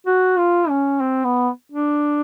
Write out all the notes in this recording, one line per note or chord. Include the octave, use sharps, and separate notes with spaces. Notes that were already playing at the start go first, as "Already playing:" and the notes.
F#4
F4
C#4
C4
B3
D4